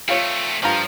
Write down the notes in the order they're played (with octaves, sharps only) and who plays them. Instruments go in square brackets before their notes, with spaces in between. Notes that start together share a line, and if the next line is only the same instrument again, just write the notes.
[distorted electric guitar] A3 C4 [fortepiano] F4 C#5
[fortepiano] G2 F4 A#5 [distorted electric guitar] F3